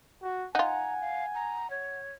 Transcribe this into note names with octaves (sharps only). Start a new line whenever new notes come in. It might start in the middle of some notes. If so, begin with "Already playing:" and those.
F#4
D#4 F4 F#5 G#5 A#5
F5
A#5
C#5